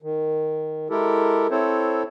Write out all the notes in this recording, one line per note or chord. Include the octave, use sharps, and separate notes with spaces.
D#3
G#3 E4 G4 A4 A#4
C4 E4 A4 C5 C#5